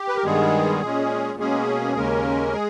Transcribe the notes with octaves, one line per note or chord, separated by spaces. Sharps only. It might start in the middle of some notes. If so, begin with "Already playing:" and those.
Already playing: G4
B4
A#4
G2 D#3 G3 G#3 B3 G#4
A#2 G#3 C#4
B2 G#3 A#3 C#4 G#4
D#2 C#3 G#3 A#3 C#4 A#4
G#3 G#4